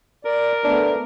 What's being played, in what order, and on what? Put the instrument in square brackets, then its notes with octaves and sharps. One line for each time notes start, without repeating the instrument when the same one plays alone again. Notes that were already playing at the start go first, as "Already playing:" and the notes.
[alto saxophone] A#4 [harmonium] D5
[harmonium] A3 B3 [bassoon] D4